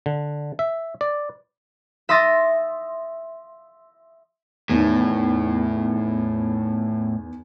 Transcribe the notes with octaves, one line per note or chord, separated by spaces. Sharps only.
D3
E5
D5
E5 C6 D#6 A6 A#6
E2 A2 D#3